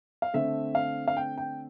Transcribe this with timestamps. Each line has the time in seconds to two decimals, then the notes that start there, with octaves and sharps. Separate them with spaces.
0.22 F5
0.34 D3 A3 C4 E5
0.75 F5
1.08 F5
1.17 G5
1.38 G5